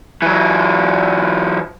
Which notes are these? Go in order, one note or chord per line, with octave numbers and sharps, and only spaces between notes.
E3 F#3